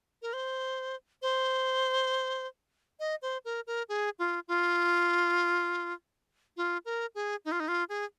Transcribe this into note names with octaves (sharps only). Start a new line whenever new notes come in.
A#4
C5
C5
D#5
C5
A#4
A#4
G#4
F4
F4
F4
A#4
G#4
D#4
F4
D#4
F4
G#4